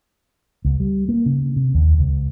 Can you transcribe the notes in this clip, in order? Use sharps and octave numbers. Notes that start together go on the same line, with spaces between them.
C#2
G3
A#3
C#3
C3
D#2
C#2